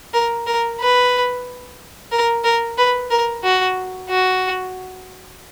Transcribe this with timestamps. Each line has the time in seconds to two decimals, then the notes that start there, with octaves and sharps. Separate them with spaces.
0.13 A#4
0.47 A#4
0.80 B4
2.12 A#4
2.44 A#4
2.77 B4
3.10 A#4
3.43 F#4
4.09 F#4